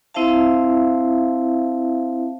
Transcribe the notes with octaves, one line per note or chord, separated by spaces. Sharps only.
C4 E4 C5 E5 F5 A5